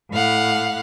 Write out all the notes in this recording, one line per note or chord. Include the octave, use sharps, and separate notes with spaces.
A2 F5 F#5